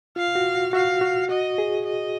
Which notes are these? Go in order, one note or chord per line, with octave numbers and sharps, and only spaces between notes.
F4 F5
F#4
F#4
F#4 F5
F#4
F#4 D#5
G#4
D#5